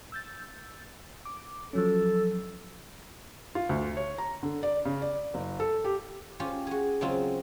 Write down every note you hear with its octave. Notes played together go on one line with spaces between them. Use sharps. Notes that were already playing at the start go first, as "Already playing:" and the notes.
E6 G6 A6
D6
F3 F#3 C#4 A4
F4
D2
C#5
A#5
D3
D5
C#3
D5
F#1
A4
G4
C#4 F4 G4
F#4 G#4
C#3 F#3 G#3 C4 F4